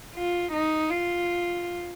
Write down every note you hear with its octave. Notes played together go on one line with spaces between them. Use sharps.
F4
D#4
F4